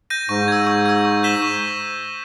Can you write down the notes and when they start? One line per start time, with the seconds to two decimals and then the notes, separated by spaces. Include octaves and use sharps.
0.10 G6 A#6 D#7
0.29 G#2 C#6
0.48 E6 G#6
0.67 C#6
0.86 E6 G#6
1.05 C#6
1.23 G6 B6 E7 G7
1.42 C#6